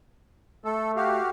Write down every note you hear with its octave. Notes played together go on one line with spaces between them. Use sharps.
A3 A4
F#4 G4 F5